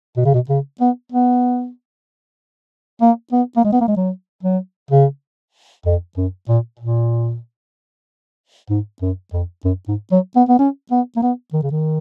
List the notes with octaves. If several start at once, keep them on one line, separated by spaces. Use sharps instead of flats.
B2
C#3
B2
C#3
B3
B3
A#3
B3
A#3
G#3
B3
A#3
G#3
F#3
F#3
C#3
F2
F#2
A#2
A#2
G#2
F#2
F2
F#2
G#2
F#3
B3
B3
C#4
B3
A#3
B3
D#3
C#3
D#3